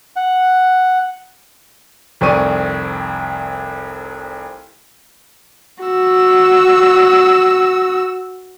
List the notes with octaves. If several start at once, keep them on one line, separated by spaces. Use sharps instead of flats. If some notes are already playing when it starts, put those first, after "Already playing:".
F#5
F1 C2 C4 D5 C#6 D#7
F#4 E6